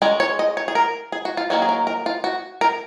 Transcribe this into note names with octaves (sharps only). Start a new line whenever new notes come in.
G#3 C#4 A#4
C#5
D#5
C#5
G#4
A#4
G#4
F#4
F4
D#3 F#3 A#3 C#4 F#4
G#4
A#4
A#4
F4
F#4
A#4